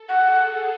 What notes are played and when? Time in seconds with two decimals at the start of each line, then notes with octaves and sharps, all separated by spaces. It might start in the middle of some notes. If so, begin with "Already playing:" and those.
Already playing: A4
0.09 F#5
0.28 G#4